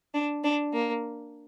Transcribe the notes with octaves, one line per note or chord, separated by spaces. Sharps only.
D4
D4
A#3